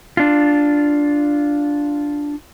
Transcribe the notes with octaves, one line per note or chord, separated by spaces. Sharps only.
D4 F4